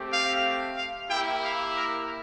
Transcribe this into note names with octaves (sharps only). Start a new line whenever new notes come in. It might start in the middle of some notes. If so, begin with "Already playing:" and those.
Already playing: A3 C4 G4
F5
F5
A#3 E4 G4 G5
F5
A#4